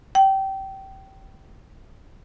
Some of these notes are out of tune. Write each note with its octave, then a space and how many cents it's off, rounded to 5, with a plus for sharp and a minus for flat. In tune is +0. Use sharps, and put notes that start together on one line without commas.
G5 -20